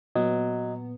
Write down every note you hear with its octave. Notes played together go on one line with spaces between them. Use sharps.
A#2 F#3 B3 D#5